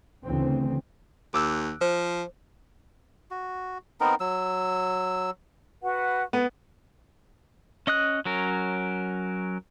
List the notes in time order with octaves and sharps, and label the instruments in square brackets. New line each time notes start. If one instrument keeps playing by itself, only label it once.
[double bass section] D2 C#3 E3 C4
[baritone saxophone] D#2 [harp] D6 E6 F#6
[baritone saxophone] F3 [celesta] C5
[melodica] F#4
B3 C4 D#4 A#4
F#3 E6
[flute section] F#4 B4 F#5
[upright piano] B3
[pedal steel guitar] C#4 D#5 D#6 F#6
F#3 C#4 A#4